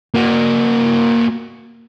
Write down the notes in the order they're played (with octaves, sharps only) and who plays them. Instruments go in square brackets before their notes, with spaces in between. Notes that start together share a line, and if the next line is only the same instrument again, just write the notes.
[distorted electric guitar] A#3 F#4